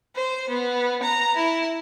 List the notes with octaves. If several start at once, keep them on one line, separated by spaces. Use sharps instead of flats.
C5
B3
A#5
E4